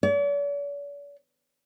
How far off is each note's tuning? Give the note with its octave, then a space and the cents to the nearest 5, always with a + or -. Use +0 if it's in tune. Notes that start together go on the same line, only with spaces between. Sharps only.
D5 -45